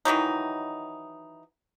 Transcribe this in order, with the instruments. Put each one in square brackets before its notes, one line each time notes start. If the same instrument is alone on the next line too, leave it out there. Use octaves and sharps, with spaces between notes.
[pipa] D#3 E3 F#3 D#4